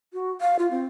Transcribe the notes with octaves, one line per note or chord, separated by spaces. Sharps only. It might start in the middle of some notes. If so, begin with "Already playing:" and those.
F#4
F5
F4
C4